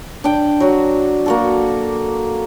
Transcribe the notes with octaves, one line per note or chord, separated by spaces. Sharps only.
D4 G5
F#3 F#4
A#3 F#4 A4